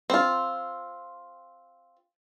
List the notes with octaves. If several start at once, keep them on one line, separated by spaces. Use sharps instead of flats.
C4 F4